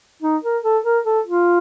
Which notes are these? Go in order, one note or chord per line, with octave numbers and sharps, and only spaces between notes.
D#4
A#4
A4
A#4
A4
F4